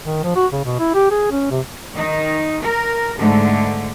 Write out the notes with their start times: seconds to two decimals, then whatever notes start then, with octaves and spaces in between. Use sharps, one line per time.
0.04 D#3
0.23 F3
0.36 F#4
0.52 C#3
0.65 B2
0.79 E4
0.94 G4
1.11 G#4
1.31 C#4
1.50 C3
1.95 D#3 D#4
2.62 A#4
3.17 G#2 D3 A3